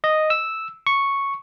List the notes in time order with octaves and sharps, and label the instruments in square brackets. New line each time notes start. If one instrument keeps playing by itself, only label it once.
[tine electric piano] D#5
E6
C#6